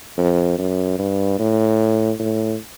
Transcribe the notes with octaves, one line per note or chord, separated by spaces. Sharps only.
F2
F#2
G2
A2
A2